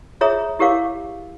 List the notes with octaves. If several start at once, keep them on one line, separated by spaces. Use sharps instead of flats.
F4 G#4 C#5 E5 A#5 D#6
E4 G4 A#4 C#5 F5 D6